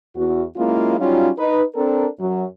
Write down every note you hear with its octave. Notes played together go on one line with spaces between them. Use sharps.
E2 F#4
F#3 G#3 A#3 C#4 E4 F4
F#3 G3 C#4 D#4 F4
D#4 B4
C4 D4 A4 A#4
F#2 F#3